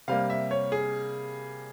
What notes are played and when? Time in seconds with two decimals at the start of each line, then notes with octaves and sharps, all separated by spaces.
0.08 C3 G3 A#3 F5
0.30 E5
0.51 C#5
0.72 G#4